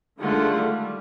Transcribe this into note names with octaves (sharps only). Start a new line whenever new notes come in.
D3 D#3 G#3 A3 F4 F#5
G3